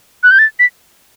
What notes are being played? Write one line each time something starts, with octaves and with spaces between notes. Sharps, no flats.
F#6
G6
A6
B6